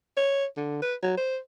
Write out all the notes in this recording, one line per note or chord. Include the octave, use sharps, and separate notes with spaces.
C#5
D3
B4
F#3
C5